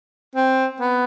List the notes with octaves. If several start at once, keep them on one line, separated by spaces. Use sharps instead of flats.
C4
B3